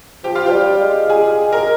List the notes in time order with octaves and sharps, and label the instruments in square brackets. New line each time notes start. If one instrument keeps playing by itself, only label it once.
[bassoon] F3 [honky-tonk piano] G4
[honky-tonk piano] F4
[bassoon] F3 [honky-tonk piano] G4
[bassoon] G3
G#3
[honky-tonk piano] G#4
A#4